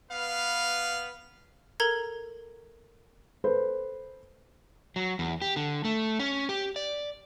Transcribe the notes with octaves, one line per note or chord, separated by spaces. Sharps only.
B3 B4 F5
A4 A#4 A#5 G#6
A4 B4 C5
F#3
E2
G4
D3
A3
C#4
G4
D5